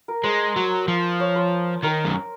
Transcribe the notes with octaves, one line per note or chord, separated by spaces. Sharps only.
A#4
G#3 C5
F#3
F3
C#5
C5
D#3 A#4
F#2